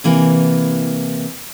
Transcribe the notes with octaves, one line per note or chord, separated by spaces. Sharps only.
C3 E3 A#3